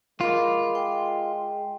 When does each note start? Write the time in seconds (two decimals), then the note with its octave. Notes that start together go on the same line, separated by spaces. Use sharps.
0.21 G#3 F4 A#4 B5 D6
0.75 G5